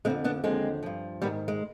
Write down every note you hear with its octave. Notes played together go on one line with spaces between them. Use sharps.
F2 D3 F3 G#3 C4
B3 D4
D#2 D3 F3 G#3 C4
G2 F3
G#2 D#3 G3 B3
G#3